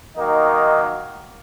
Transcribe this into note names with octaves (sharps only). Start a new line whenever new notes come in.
D#3 F#3 A#3 D#4